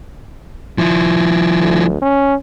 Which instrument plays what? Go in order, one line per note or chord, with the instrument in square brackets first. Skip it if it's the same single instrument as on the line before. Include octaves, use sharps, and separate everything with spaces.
[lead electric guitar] F3 E4
[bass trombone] D2
C#4